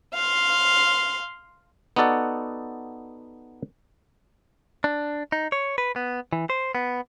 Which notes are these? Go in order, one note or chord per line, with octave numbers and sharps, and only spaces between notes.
F5 C6
B3 D#4 F#4 A4 D5 F#5
D4
D#4
C#5
B4
B3
E3
C5
B3